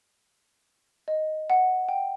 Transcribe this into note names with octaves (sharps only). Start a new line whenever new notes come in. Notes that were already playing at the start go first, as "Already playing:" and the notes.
D#5
F#5
G5